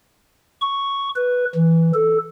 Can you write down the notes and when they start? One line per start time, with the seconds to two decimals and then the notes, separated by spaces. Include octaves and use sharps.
0.61 C#6
1.16 B4
1.55 E3
1.94 A4